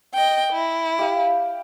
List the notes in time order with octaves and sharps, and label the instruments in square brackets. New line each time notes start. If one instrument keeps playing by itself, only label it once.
[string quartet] D#5 G5
E4
[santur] G4 E5 F5